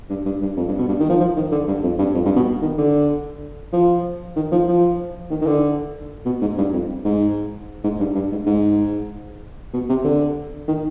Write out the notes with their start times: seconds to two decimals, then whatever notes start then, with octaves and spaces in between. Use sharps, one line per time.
0.10 G2
0.25 G2
0.42 G2
0.57 F2
0.68 G2
0.78 B2
0.88 G2
1.00 D#3
1.09 F3
1.21 F3
1.36 D#3
1.52 D3
1.68 G2
1.83 F2
1.99 G2
2.15 F2
2.25 G2
2.36 B2
2.62 D#3
2.78 D3
3.73 F3
4.36 D#3
4.52 F3
4.68 F3
5.31 D#3
5.42 D#3
5.47 D3
6.25 B2
6.41 G#2
6.57 G2
6.73 F2
7.04 G#2
7.84 G#2
8.00 G2
8.15 G2
8.31 G#2
8.46 G#2
9.74 B2
9.89 C3
10.05 D3
10.68 D#3